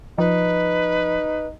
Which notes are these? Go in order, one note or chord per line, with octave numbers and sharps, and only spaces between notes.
F3 D#4 B4